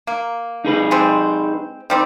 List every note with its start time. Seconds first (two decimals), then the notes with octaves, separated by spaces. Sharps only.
0.07 A#3
0.65 D#4 G#4 B4
0.91 G3 G#3 C4
1.90 D#3 G3 C4